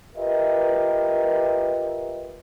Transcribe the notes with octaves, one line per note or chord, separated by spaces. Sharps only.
F4 G4 A#4 B4 D#5 E5